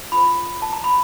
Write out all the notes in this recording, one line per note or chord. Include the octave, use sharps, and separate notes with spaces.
F4 A4 C5 B5
A5
A#5
B5